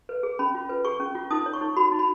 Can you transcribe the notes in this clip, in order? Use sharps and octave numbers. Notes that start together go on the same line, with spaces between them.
B4
G#4
C#4 B5
F4
B4
G#4 C#6
C#4
F4
D#4 D#6
C#5
C#6
D#4
F#4 B5
D#4
B5